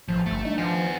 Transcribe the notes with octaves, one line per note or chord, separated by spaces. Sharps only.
A1 F3
G1 A3
A3 D4 D#4
F3 B3 G#5